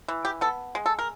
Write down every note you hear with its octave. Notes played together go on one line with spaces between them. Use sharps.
E3
G4
B3 A4
G#3
A4
A#4